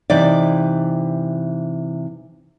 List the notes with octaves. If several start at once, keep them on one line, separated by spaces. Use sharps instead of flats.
C3 E3 D#4 D5